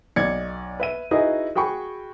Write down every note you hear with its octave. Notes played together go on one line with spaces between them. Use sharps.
B1 D5 G#6 C#7
B4 E5 D#7
D#4 E4 F#4 G#4 B4 D#5
F#4 G#4 G5 B5 C#6